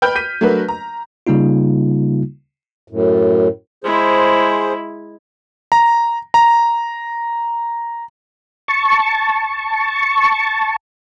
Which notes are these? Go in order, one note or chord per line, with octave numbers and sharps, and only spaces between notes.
B4 G5 B5 F6 G6
G6 B6 D#7
F#3 A3 D4 F#4 A#4 B4
A#5
C#3 G3 A#3 D#4 F4
F#2 A2
G#3 E4 G#4 C5
A#5
A#5
A5 C#6